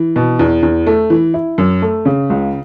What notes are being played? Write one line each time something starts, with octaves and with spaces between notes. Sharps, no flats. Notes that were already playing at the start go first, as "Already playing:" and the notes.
Already playing: E3
B2
E2
E2
A3
E3
E4
F#2
A3
C#3
C#2